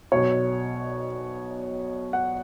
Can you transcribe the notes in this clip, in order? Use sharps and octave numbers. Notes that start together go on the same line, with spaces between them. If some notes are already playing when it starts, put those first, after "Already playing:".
B1 B2 C#5
F#5